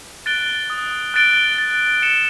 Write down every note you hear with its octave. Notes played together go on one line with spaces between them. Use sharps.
F#6 A6 D7 G7
D#6
F#6 A6 D7 G7
A6
C#7 E7